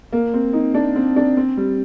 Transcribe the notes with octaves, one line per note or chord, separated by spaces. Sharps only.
A#3
C4
D#4
D4
C4
D4
C4
G3